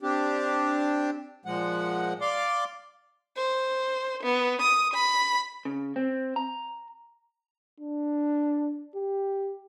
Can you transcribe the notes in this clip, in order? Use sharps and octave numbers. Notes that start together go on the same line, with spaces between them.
C4 D4 G4
A#2 F3 G#3 F#5
D5 F5 C6 D6
C5
B3
D#6
B5
C#3
C4
A#5
D4
G4